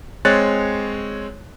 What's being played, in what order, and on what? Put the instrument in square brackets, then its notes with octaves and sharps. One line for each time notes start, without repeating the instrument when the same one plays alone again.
[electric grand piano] G#3 C4 C#5 F#6 A6